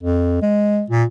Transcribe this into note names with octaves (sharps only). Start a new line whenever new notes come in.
F2
G#3
A#2